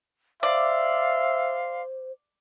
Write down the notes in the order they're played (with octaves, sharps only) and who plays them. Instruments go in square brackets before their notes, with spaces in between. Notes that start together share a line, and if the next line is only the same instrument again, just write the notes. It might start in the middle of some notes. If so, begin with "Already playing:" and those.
[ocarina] C5 [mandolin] D5 [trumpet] E5 [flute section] F5 C6